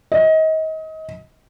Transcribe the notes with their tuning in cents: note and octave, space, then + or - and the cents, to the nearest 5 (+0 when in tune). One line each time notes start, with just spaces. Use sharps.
D#5 +30